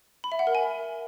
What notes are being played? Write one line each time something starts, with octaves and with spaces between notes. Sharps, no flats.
B5
E5
F#5
A#4
G#5